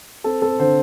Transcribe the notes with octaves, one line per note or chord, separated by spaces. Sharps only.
C4 A4
C4 A4
D3 C5